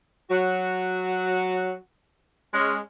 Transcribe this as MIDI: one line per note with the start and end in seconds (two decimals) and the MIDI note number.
0.30 1.73 54
0.30 1.73 66
2.54 2.78 56
2.54 2.78 61